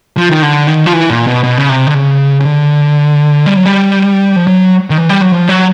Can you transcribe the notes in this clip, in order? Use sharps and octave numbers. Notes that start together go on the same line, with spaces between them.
F3
D#3
D3
D#3
F3
E3
A#2
B2
B2
C#3
C3
D3
C#3
C#3
D3
G3
F#3
G3
F3
F#3
D#3
E3
G3
F#3
F3
F#3